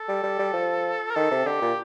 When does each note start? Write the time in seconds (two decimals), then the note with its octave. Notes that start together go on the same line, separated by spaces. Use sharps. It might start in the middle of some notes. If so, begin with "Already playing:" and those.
Already playing: A4
0.08 G3
0.23 G3
0.39 G3
0.53 F3
1.10 A#4
1.15 D#3 A4
1.31 C3
1.46 D3 G4
1.61 A#2